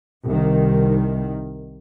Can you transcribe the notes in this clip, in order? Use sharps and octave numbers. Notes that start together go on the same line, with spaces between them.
C2 D#3